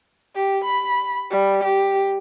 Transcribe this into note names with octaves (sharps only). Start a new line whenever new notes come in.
G4
B5
G3
G4